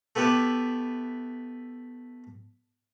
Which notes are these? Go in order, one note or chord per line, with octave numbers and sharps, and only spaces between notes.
A3 B3 E4 G4 B4